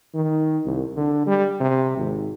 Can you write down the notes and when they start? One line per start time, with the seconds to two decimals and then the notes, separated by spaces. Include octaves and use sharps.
0.15 D#3
0.66 C2
0.96 D3
1.26 G3
1.60 C3
1.97 G#1